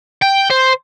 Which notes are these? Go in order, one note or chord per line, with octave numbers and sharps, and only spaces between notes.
G5
C5